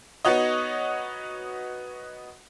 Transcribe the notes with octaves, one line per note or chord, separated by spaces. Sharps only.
B3 D#4 F#4 C#5 D#5